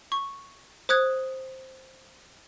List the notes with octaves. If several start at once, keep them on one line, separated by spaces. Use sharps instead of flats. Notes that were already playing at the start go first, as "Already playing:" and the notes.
C#6
C5 D#6 F#6 G#6